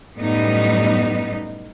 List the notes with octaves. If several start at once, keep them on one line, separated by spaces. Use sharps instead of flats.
F#2 A2 G3 B3 D#4